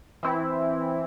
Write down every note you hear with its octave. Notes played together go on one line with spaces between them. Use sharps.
E3 C4 E4